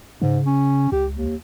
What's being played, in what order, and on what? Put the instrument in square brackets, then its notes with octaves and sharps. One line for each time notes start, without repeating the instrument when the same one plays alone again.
[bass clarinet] G#2 [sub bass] C#3
[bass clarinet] C#4
[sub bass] C#2 [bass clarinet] G4
[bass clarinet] D#2